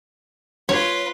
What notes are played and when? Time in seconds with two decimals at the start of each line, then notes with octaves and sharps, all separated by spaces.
0.69 F4 B4 C#5